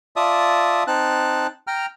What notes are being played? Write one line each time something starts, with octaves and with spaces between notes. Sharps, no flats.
F4 D5 E5 A5 D#6
C4 D#4 A5 F#6
G5 A#5 F6